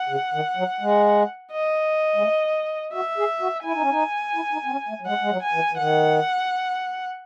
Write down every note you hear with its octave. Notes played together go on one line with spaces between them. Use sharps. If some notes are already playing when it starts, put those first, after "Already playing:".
Already playing: F#5
C#3
D#3
F#3
G#3
D#5
G#3
A3
F#4 E5
G#4
F#4
E4 G#5
D#4
C#4
D#4
E4
D#4
C4
C#4
A3
F#3
G#3 F#5
G#3
F#3
G#5
E3
E3
D#3 F#5